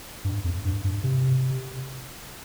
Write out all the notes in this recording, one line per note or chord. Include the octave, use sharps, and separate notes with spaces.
G2
F2
G2
G2
C3